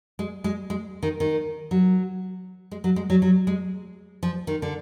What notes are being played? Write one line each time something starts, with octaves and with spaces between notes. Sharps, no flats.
G#3
G#3
G#3
D#3
D#3
F#3
G#3
F#3
G#3
F#3
F#3
G#3
F3
D#3
D3